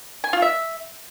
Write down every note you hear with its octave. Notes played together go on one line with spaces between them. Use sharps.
G#5
F4
E5